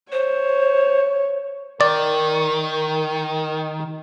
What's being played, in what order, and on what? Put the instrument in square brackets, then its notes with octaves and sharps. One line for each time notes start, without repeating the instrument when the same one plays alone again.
[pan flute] C5 [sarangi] C#5
[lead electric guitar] D#3 [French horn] A#4 [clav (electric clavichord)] D5